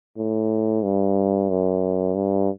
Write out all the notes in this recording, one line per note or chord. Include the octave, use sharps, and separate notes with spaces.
A2
G2
F#2
G2